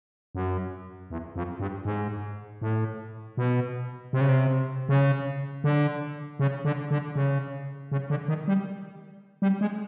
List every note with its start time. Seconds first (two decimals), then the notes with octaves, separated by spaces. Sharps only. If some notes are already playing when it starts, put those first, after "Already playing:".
0.35 F#2
1.10 E2
1.36 F2
1.60 G2
1.85 G#2
2.62 A2
3.37 B2
4.13 C3
4.21 C#3
4.29 C3
4.89 C#3
5.64 D3
6.39 C#3
6.65 D3
6.91 D3
7.16 C#3
7.92 C#3
8.10 D3
8.28 D#3
8.48 G3
9.42 G3
9.61 G#3